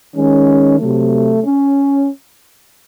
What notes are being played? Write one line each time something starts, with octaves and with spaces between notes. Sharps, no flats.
D#3 G#3 C#4
C3 F#3 A3
C#4